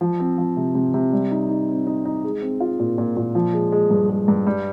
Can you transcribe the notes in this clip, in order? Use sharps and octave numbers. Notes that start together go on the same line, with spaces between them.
F3
C4
F3
C3
C3
C3
G3
D#4
D#4
C4
D#4
D#4
G#3
C4
F4
A#2
A#2
A#2
F3
G#3
G#3
G2
G#3
G2
G3